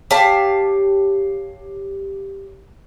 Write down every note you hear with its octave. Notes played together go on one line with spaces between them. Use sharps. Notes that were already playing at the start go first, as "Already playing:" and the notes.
G4 C#5 F5 A5